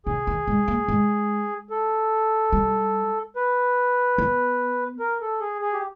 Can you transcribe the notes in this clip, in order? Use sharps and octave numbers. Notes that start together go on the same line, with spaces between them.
D3 G#4
D#3
G#3
A#3
G#3
A4
G3
B4
B3
A#4
A4
G#4
G#4
G4